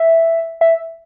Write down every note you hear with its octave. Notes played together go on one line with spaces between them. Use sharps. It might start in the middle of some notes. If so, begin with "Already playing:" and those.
Already playing: E5
E5